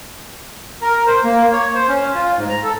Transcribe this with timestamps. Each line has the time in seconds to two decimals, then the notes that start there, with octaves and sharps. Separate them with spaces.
0.81 A#4
1.07 C5
1.24 A#3
1.52 C#5
1.75 C5
1.88 C#4
2.15 F4
2.37 G#2
2.49 A#5
2.64 A4